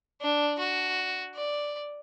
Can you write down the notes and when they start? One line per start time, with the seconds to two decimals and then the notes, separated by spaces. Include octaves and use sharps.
0.22 D4
0.59 F#4
1.35 D5